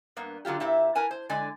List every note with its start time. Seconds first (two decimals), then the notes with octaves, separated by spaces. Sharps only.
0.17 G2 A#3 B3
0.45 D3 F#3 F4 G4
0.60 A#2 E4 G4 E5
0.95 A#4 B4 G#5 A5
1.11 C5
1.29 D3 G#3 D5 G#5